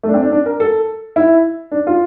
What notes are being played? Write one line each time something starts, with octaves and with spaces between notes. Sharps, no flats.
A3
D4
C4
D4
D4
A#4
A4
E4
D4
F4